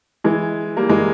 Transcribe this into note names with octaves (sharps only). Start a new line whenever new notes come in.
E3 G#3
G3 A#3
E3 G#3